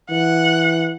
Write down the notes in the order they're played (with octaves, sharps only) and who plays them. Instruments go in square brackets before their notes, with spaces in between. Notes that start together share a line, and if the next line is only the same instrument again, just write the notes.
[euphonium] E3 [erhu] F#5